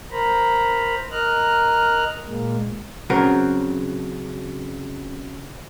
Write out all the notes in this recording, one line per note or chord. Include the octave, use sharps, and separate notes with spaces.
A#4 C5 A#5 B5
A#4 D#5 A#5 F6 F#6
A#2 G#3 A#3
C#3 F#3 C4 A#4